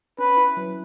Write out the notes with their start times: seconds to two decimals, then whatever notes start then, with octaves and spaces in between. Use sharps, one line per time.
0.19 C#4 B4
0.37 E4
0.57 F#3